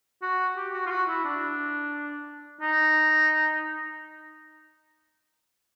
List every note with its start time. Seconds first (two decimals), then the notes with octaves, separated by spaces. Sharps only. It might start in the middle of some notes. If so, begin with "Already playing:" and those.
0.22 F#4
0.56 G4
0.73 F#4
0.86 F4
0.90 F#4
1.08 E4
1.24 D4
2.61 D#4